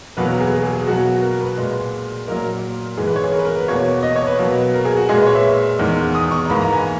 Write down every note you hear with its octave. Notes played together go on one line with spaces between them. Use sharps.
E2 B2 F#3 A#3 B4
A#4
G#4
G#4
G#4
G#4
B2 F#3 A#3 F#4
A#4
B4
A#2 G#3
A#2 F#3 A#3 A#4
G#2 E3 G#3 G#4
B4
C#5
G#4
A#4
B4
A#4
B4
E2 B2 A#3 C#5
D#5
C#5
B4
B2 F#3 A#3
A#4
G#4
F#4
A#2 G#3 G#4
B4
C#5
E5
E2 D#3 G#3
D#6
C#6
A#5
G#2 E3 A#3 B5
A#5
G#5